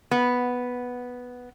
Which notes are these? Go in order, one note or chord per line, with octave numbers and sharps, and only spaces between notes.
B3